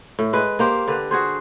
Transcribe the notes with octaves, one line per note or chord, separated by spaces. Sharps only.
A2
G#3 B4
A#3 G4 C5
D3 B4
F#4 G#4 C5